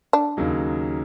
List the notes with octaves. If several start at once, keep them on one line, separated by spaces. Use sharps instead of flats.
D4
D#2 C#3 F#3 A#3 D#4